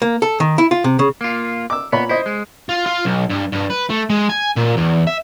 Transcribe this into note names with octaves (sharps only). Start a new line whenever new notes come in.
A#3
A4
D#3
E4
F4
C3
C#3
A#3 F4
D6 E6
A#2 B3 C#5 B5
E4 C5 D#5
G#3
F4
F4
B1
G2
G2
B4
A3
G#3
G#5
A#2
E2
E5